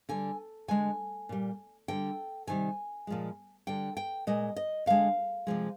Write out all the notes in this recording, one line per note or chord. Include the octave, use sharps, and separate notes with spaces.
D3 G3 G#5
D3 G#3 G#5
A#2 G3
D3 G3 G5
C3 D#3 G3 G#5
A#2 F3 G#3
D3 G3 G5
G5
A#2 G#3 D#5
D#5
D3 G#3 F5
C3 F3 G#3